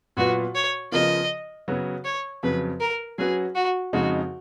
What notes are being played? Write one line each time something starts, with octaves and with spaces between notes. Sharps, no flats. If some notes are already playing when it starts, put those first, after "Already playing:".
A#2 F#3 B3 F4 F#4 B4
C#5
C#3 F3 B3 F4 A#4 D#5
C#3 F#3 B3 F#4 C#5
C#5
F2 C#3 F#3 B4
A#4
F#3 C#4 F#4 G#4 B4
F#4
F2 C#3 G#3 D#4 F#4